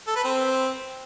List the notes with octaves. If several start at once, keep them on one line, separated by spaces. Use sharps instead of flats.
A4
B4
C4